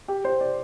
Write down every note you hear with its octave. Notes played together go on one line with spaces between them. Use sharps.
G4
C5
D5